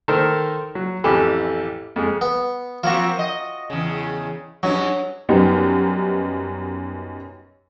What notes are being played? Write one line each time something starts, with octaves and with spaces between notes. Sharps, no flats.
D#3 A4 A#4 C5
F#3
A1 F2 E3 G4 A4 B5
F2 G#3
B3
F3 A#3 C4 F4 F#4
D#5
E2 C#3
G2 F#3 C#4 D#4
F#2 G3 B3 D#4 G4